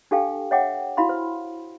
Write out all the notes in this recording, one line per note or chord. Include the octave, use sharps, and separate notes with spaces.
D4 G4 A4 F5 G5
C#5 E5 F#5 G5 D6
E4 F#4 F5 B5 C6
C5